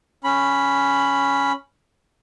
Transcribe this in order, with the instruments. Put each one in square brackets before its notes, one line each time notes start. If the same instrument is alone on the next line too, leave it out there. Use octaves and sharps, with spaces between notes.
[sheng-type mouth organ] C#4 B5